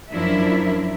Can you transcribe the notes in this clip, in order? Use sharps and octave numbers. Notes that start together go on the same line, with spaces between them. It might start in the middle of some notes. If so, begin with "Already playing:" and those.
F#2 F3 D4 E4 A#4 E5